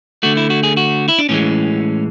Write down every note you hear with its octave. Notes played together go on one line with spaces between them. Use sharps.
D3 A3 F#4
E4
F#4
G#4
F#4
E4
D4
A2 E3 G#3 C#4